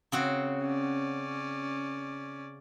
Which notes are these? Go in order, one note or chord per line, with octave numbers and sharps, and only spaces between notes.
C#3 C4 F#4
C#4 D5